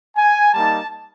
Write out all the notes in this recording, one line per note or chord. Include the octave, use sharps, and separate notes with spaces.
G#5
G3 A#3 D#4 A5